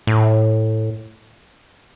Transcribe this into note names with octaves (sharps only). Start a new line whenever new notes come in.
A2